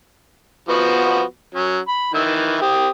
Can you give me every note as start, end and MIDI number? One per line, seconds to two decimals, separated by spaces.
0.69 1.21 53
0.69 1.21 59
0.69 1.21 66
1.55 1.78 54
1.55 1.78 61
1.88 2.10 83
2.14 2.59 51
2.14 2.59 52
2.14 2.59 76
2.62 2.88 60
2.62 2.88 67
2.62 2.88 87